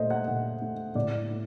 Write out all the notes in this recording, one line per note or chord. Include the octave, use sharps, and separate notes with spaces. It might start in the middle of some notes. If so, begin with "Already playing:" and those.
Already playing: A#2 A3 C5 D#5
F#5
A#2
A3
A2 D5
A3